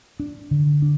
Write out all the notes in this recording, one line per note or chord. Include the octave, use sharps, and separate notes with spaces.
D4
D3
D4